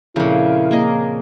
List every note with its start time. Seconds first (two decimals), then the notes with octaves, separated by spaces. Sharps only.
0.16 F2 A#2 C#3 E4
0.71 A#3 G#4 D#5